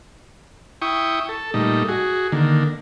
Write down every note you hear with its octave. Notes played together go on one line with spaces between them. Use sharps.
E4 G5 C#6 D#6
A4
A#2 G3 A3 D#4
F#4 G#4
D3 D#3 A#3